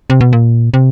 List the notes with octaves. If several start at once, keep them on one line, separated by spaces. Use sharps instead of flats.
C3
B2
A#2
C3